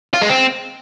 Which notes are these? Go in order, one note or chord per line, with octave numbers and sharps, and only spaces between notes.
F4
G#3
C4